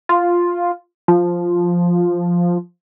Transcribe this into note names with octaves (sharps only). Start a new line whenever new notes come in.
F4
F3